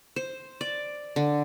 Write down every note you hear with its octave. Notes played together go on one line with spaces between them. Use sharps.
C5
D5
D3